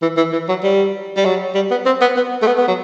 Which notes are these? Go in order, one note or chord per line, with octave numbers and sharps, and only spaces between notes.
E3
E3
E3
F#3
G3
G3
F#3
G3
B3
C4
B3
B3
A3
B3
B3
F#3